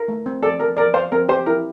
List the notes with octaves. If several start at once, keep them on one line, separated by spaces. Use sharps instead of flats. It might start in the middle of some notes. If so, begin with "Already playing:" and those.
Already playing: A#4
A3
C4
A4 D5
A4 A#4
A#4 D5
C5 F5
C4 A#4
G4 C5
E4 A#4